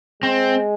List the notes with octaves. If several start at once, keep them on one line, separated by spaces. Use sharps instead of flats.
G#3 C4